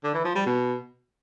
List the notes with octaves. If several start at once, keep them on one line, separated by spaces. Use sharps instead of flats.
D3
E3
F3
G3
B2